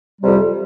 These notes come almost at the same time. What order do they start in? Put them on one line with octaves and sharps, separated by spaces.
G3 C3 F2